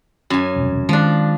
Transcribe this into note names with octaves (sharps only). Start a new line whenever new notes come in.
F#2 G#5
E1 C2
D#3 F3 G#3 D4